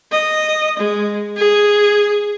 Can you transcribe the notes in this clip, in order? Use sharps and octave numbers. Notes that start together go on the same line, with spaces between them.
D#5
G#3
G#4